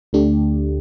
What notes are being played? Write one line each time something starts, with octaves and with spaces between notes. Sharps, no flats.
D2 D3 A3 D4 G4